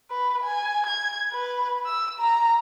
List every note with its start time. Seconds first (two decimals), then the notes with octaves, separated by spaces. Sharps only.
0.11 B4
0.44 G#5
0.86 G#6
1.32 B4
1.86 E6
2.20 A#5